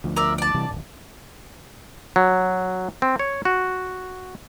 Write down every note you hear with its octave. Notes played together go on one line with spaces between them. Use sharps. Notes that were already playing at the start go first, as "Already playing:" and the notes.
D2 F3
A#4 D5 E5
D5 A5
C3 E3 G3
D1 G#1
F#3
C4
C#5
F#4